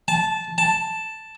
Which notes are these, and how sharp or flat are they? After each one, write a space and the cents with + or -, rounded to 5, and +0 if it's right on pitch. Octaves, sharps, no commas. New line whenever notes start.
A5 -15
A5 +0